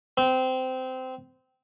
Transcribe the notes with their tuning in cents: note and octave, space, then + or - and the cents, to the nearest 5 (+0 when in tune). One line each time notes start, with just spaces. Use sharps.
C4 -20